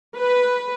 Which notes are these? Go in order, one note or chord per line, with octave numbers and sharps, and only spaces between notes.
B4